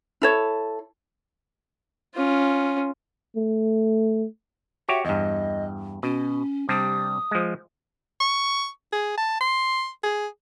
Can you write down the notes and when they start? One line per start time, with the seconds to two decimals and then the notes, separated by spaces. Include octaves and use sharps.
0.22 E4 A4 C#5
2.15 C#4 F4
3.37 A3
4.89 F#4 G4 C#5 E5
5.05 E2 G2 D#5
6.03 B2 C#4
6.69 C3 G3 D4 D#6
7.31 F3 G#3
8.20 C#6
8.93 G#4
9.17 A5
9.41 C6
10.03 G#4